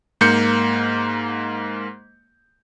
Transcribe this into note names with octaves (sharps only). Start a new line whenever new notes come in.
G#2 A#3 G6 C#7